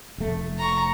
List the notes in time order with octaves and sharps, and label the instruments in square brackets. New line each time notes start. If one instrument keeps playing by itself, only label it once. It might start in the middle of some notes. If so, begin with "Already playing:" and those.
[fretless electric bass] F1 A3
[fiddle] A#5 C#6